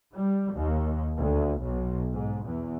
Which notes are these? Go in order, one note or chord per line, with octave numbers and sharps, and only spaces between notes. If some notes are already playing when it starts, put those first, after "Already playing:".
G3
D#2
D2
B1
G#2
E2